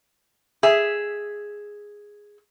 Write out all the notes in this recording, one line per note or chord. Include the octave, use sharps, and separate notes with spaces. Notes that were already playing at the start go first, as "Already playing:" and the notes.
G#4 E5